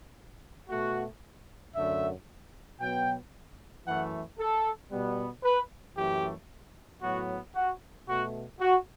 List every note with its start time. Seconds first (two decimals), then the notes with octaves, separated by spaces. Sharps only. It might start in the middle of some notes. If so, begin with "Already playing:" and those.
0.69 B2 A3 F#4
1.75 F#2 D3 A3 E5
2.80 B2 F#3 B3 G5
3.86 F#2 E3 A3 F#5
4.39 A4
4.91 B2 G3 B3
5.43 B4
5.96 F#2 E3 A3 G4
7.02 A2 F#3 B3 F#4
7.55 F#4
8.07 B2 A3 F#4
8.60 F#4